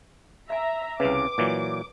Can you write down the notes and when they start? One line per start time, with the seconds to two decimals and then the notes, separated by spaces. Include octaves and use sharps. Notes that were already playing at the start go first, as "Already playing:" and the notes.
0.50 E5 F5 G#5 A#5
1.00 C2 C#3 B4 G5 D6
1.38 A#2 E3 F#3